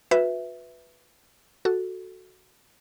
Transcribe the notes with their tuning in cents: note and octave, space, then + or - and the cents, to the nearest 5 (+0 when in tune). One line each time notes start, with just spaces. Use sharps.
F#4 -40 B4 +0 E5 +0
F#4 +0 A4 +0